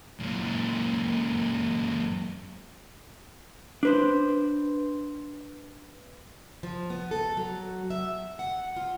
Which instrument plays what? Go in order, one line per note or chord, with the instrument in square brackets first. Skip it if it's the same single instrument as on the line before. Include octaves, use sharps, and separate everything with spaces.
[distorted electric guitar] F#2 A#2
[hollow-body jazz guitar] D4 B4 C5
[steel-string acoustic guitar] F3
B3
A4
F#3
E5
F#5
F4